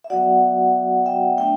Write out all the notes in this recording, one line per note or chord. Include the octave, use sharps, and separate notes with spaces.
E5
F#3 B3 F#4 D5 F#5
E5 G5
A3 D4 E5 G5